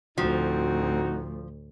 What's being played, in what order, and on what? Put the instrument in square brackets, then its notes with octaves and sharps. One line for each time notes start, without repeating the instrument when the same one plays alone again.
[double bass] D2 A2 [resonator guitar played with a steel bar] F3 [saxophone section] C4 D#4 F#4